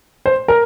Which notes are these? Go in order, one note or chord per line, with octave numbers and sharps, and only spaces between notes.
C5
A#4